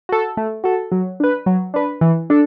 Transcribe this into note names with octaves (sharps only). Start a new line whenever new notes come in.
F#4 A4
A3
F#4 A4
F#3
D4 B4
F#3
D4 B4
E3
D4 A4